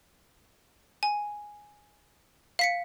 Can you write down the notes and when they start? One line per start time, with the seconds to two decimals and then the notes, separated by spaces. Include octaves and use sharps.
1.03 G#5
2.59 F5 B6 C#7